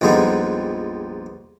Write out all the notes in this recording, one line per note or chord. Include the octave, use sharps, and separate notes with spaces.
A#1 F2 G3 G#3 B3 D#4